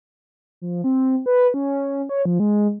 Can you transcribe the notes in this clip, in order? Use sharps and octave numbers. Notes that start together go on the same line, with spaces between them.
F3
C4
B4
C#4
C#5
F3
G#3